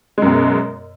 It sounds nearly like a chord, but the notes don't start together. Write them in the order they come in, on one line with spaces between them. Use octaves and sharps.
G#3 F#2 B2